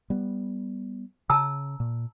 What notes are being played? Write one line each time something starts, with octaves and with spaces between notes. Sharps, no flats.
G3 B3
C#3 A5 A#5 E6
A#2